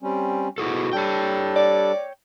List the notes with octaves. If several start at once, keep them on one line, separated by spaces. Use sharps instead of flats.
G3 C4 C#4
B2 E4 F#4 G#4 A4
G3 D4 A4 C#5 G5
D5